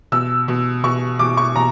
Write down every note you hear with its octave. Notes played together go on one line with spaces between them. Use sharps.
B2 E6
B2
B2 C#6
B2 D6
C#6
B2 A#5